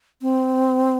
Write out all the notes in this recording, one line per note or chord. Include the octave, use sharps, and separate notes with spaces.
C4